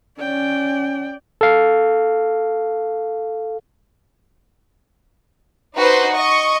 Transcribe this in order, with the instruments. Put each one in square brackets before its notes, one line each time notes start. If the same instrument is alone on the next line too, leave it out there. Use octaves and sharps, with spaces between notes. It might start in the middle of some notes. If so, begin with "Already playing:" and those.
[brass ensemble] C#4 [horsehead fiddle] D5 G5
[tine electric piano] A4 F5
[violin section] D#4 F#4 B4 C5
D#5 C#6